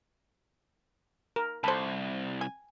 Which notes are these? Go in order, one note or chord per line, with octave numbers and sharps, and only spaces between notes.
A#4
C2 A4 C5 A5 B5
G#5